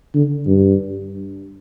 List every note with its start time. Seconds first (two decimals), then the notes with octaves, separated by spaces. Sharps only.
0.15 D3
0.46 G2